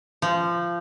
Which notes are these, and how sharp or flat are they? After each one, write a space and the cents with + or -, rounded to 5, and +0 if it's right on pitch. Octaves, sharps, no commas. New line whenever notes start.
F3 -20